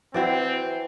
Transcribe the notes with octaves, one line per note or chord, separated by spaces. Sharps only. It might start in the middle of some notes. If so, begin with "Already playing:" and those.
E3 C4 E4 F#4 D5 G5